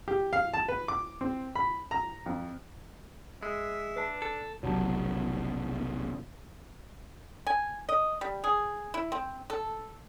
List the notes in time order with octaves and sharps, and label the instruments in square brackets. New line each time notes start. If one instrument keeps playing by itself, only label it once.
[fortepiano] G4
F5
A5
B4
D6
C4
B5
A#5
F2
[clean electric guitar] G#3 [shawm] E5
[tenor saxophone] D4 [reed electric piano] B4 A5
[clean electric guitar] A4
[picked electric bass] F1 B1 [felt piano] F#3 A5
[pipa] G#5
D#5
G3
G#4
E4
C4
A4